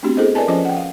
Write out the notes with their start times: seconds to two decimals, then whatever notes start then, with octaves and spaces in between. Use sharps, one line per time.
0.03 A3 B3 C4 D4 F#4 G4
0.17 E4 G#4 A4 C5 D#5
0.35 A#4 B4 D5 D#5 G#5 A5
0.48 F3 C#4 F4 C5 D#5 D6
0.65 F#5 G5
0.77 F5